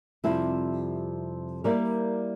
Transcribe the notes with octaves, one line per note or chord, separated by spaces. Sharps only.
F2 C3 G3 C4 E4
G3 A#3 E4 A#4 D5